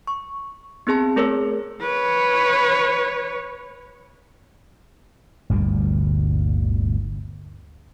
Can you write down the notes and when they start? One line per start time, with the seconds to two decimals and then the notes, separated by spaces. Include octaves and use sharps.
0.07 C#6
0.87 B3 C4 G#4 A5 C6
1.16 A3 G#4 A#4 C#5 E6
1.82 B4 C#5
5.50 G1 D2 A#2 G3